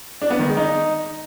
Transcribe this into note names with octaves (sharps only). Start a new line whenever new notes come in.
D4
B3
D#3
G#3
D#4